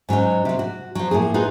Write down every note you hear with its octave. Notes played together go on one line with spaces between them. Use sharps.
G#2 F#3 C#4 D#4
C3 F#3
F#4
F3 F#3
A2 F3 A#3 G#4
D#4 F4 F#4 G#4 B4